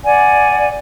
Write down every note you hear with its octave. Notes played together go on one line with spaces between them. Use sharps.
D5 F#5 G#5